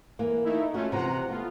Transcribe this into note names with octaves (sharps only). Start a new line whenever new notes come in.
E3 A#3
A3 D#4 E4
A3 C#4 F4 F#4
C3 E3 F3 F#5 A#5
A3 B3 F4